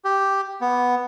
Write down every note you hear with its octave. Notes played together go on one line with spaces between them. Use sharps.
G4
B3